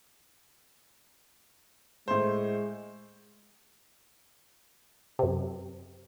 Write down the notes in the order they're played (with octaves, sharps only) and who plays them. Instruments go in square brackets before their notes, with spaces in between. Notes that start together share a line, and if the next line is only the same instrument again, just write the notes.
[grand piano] A2 C5 [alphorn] G#3
[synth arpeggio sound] F#2 C3